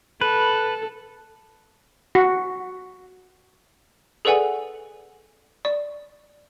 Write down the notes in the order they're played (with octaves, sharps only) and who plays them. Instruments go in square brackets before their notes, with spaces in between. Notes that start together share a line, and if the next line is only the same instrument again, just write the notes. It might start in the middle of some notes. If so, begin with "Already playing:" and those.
[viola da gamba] A4 [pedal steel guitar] B4
[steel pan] F#4
[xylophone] G#4 A4 B4 D5 F#5 G#5
D5